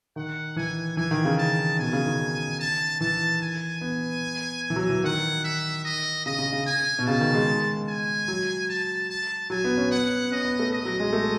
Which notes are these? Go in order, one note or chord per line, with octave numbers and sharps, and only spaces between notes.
D#3 F#5
E3 G#5
E3 G#5
D#3
C#3
A5
B2 G#5
C#3
D#3
A5
E3 A5
G#5
B3
G#5
E3
F#3
E3
D#3 F#5
E5
D#5
C#3 D#5
C#3
C#3
G#5
B2
C#3 A5
D#3
G#3
G#5
F#3
A5
A5
F#3 G#5
B3
C#4
B3 F#5
C#4 D#5
B3
A3
D#5
F#3
G#3
A3